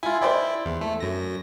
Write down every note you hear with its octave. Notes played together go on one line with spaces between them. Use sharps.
E4 F4 G#5
E4 C5 D5 G5
E2
A3
F#2 A#6